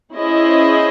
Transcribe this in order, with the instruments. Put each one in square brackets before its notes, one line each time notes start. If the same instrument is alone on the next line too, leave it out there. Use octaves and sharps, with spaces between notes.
[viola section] C#4 E4 G#4 C5 D#5